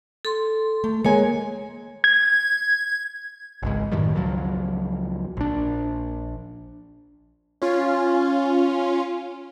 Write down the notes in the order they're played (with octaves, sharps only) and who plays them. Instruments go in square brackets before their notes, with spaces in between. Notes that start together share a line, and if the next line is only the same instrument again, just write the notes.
[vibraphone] A4 C6
[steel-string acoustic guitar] A3
[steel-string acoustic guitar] G#3 A#3 G#5 [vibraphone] C#5
[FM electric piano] G#6
[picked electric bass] G#1 C#2 G#2
F#2 A2 D#3 G3
C#2 F3 F#3
A#1 D4
[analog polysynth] C#4 F4